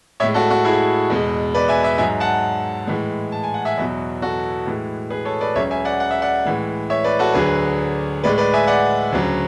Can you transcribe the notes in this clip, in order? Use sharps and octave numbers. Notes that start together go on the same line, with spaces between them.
A2 G#3 C#5 E5
F#4 A4
F#4
E4 G#4
E2 B2 G#3
B4 D5
E5 G#5
E5 G#5
G#2 F#3 E5 G#5
F#5 A5
A2 E3 G#3
A5
G#5
F#5
E5 G#5
E2 B2 F#3
F#4 A4
A2 E3 G#3
G#4 B4
A4 C#5
B4 D5
C#2 C#3 F#3 C#5 E5
E5 G#5
D5 F#5
F#5
E5
D5 F#5
A2 E3 G#3
C#5 E5
B4 D5
F#4 A4
D2 D3 F#3 G#4 B4
A2 G#3 B4 D5
B4 D5
E5 G#5
D5 F#5
D2 C#3 F#3